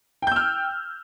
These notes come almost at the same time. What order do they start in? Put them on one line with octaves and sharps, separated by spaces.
G5 G6 E6 F6